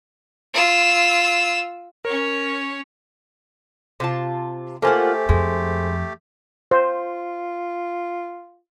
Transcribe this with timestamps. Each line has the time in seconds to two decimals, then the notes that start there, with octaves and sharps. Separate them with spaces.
0.54 F4 E6
2.05 C#4 A#4 C#5
4.00 C3 F4 A5
4.82 A3 A#3 F4 G4 A4 C5 F#5 G#5
5.29 F2 G#3
6.71 F4 C5